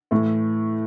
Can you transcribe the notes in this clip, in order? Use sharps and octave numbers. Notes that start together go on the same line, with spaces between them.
A2 E3 A3